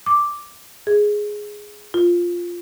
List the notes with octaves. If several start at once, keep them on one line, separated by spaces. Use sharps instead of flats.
D6
G#4
F4